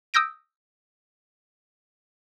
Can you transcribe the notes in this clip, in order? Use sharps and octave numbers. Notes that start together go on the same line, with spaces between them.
D#6 E6 G6 A#6 D7